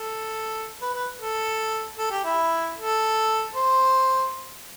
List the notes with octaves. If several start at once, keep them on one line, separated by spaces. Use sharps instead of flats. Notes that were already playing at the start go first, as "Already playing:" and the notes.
Already playing: A4
B4
B4
A4
A4
G4
E4
A4
C5